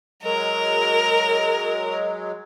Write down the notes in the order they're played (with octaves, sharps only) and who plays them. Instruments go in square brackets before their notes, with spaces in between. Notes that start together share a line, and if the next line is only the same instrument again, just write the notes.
[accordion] F#3 G#3 [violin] A#4